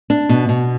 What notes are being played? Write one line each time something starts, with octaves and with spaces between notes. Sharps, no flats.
D4
B2
B2